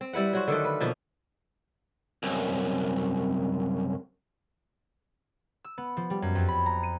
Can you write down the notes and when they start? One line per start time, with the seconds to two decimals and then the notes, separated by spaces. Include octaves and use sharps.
0.01 C4
0.13 G3 E4 B4 F#5
0.33 F#3 F#4 C5
0.48 D3 D#3 A3
0.65 B4
0.80 B2 F3 A#3
2.23 C2 F#2
5.64 E6
5.78 B3
5.97 F3
6.10 G3
6.22 F#2
6.35 F2
6.48 B5
6.66 A#5
6.83 D#7